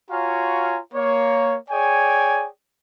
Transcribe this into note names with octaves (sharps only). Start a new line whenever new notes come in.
F4 F#4 C#5 F5 G#5 A#5
A#3 C#5
G#4 C#5 D5 G5 G#5